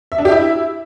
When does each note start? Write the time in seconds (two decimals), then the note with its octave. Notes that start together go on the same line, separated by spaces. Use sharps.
0.12 E5
0.18 D4
0.25 G4
0.32 E4